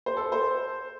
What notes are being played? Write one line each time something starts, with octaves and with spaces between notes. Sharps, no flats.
C5
A4
C5